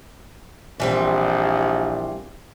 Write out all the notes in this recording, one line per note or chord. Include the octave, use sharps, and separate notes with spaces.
A#1 E3 G3 C4